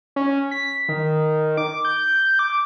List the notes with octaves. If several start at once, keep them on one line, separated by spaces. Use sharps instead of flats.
C#4
B6
D#3
D6
G6
D6